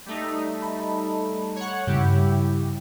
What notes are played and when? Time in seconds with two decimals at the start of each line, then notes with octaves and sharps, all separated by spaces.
0.06 G3 A3 D#4
0.62 A5 B5
1.56 C#5 F#5
1.87 G2 C#3 G3 E4 G4